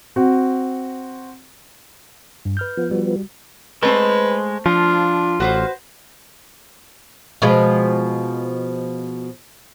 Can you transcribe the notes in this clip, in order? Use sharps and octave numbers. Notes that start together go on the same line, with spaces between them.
C4 F#4
G2
B4 F6 G6
F3 B3
G3 F#4
G#3 A3 C4 B4 C5
F3 D4 F4
A1 F#4 B4 C5
B2 F3 G#3